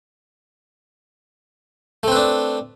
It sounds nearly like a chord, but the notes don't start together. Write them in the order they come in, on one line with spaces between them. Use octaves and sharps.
A3 C4 B4 D4